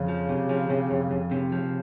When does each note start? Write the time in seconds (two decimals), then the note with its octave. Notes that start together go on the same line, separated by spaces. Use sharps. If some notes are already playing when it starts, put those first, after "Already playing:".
Already playing: F2 C#3
0.08 F3
0.29 C3
0.49 F3
0.70 C3
0.90 F2
1.11 F2
1.31 C3
1.52 F3